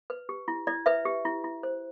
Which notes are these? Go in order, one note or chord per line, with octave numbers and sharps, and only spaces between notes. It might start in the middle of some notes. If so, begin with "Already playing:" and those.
B4
G4
E4
E4 D5
B4 E5
G4
E4
E4
C5